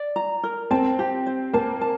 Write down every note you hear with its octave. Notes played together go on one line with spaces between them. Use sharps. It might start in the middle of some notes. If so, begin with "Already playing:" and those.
Already playing: D5
A#5
A#4
C4 A5
G4
C5
A#3 A5
A5